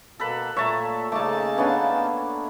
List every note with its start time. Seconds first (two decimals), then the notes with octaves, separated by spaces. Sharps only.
0.20 B2 A#3 A4 B4 B5
0.56 A#2 A3 C#5 E5 A5 A#5
1.12 C#3 A3 A#3 D#4 A5 D6
1.58 B3 C#4 D4 F5 G#5